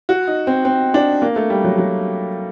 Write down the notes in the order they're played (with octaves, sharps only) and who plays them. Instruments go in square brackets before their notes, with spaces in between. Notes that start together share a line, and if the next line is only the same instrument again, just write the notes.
[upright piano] F#4
D#4
C4
C4
D4
A#3
A3
G3
F#3
F#3